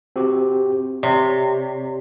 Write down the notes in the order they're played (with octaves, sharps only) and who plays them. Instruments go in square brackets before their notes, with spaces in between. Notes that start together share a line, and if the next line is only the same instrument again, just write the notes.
[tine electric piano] C4 F#4 G4
[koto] C3 [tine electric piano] C#5 D5